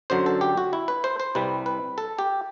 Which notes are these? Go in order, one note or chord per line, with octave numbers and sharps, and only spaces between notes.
F#2 D3 F#3 C5
A4
G4
F#4
E4
B4
C5
C5
C2 C3 G3 B4
B4
A4
G4